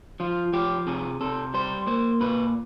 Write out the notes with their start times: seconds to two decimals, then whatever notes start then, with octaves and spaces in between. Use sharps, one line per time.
0.20 F3 F4
0.53 F3 G4
0.87 C3 G#4
1.21 C3 A4
1.54 G3 C5
1.87 A#3 C5
2.21 A#2 B4